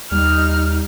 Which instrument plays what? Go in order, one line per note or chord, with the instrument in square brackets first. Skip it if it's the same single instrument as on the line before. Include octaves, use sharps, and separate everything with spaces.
[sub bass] D#2 [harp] G3 [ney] D#4 [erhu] F6